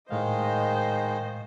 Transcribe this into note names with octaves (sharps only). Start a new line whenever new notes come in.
A2 D#3 G#3 C5 D#5 F5